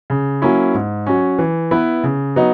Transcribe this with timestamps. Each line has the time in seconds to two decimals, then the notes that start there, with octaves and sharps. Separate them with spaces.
0.10 C#3
0.42 F#3 A#3 C#4 E4
0.74 G#2
1.06 F#3 C#4
1.39 E3
1.71 B3 E4 B4
2.03 C#3
2.36 F#3 B3 D#4